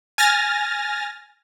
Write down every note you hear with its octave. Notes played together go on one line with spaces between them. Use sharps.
G#5 F6 A6 A#6